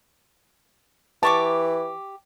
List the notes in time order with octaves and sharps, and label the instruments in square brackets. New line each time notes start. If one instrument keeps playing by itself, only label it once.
[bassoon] E3 [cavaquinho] G4 C#6 D6 [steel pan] A5